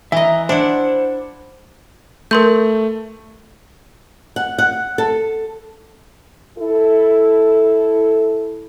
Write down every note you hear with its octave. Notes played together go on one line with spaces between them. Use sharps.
E3 D#5 E5 A#5
D4 E4 C5 F#5
A3 A#4 C6 G6
F#5
F#5
A4
E4 A4